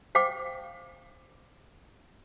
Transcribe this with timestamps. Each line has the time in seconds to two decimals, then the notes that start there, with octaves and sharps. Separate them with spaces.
0.15 C5 F5 G5 D6